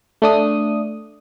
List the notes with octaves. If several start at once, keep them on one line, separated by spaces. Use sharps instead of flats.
A3 D4 D#6